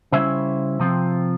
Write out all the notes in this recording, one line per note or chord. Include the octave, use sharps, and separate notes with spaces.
C#3 G3 C#4 E4 C5 E5
C3 F3 C4 F4